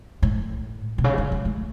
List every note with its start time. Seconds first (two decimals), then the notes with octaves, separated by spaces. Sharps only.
0.23 A2
0.98 B2
1.04 C#3
1.13 B2
1.18 C#3
1.32 C#3
1.45 A3